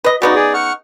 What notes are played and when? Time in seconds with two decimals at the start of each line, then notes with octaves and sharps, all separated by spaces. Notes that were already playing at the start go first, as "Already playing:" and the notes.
0.04 B4 D#5
0.22 C#3 B3 D#4 F#4 D5
0.35 G#4 D5
0.54 F#5 C#6 F6